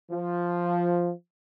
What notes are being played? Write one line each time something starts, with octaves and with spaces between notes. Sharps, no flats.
F3